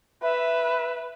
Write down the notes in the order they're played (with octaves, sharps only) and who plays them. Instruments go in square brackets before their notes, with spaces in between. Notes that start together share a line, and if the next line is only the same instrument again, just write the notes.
[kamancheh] B4 [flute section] E5